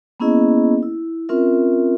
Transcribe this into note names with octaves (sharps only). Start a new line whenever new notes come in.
A#3 B3 C#4 E4 G#4 D#5
E4
C4 C#4 F4 A#4 E5